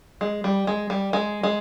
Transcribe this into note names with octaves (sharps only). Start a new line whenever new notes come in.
G#3
G3
G#3
G3
G#3
G#3